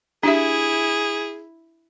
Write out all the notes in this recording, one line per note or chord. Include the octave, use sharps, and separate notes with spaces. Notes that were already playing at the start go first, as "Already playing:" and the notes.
D4 E4 G4 G#4 E5